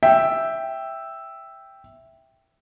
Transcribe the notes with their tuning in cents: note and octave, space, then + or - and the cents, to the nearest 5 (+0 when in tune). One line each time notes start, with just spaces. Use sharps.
E5 +0 G5 +0